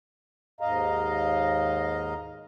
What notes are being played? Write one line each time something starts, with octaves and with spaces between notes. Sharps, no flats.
D#2 G#2 D#5 F5 A#5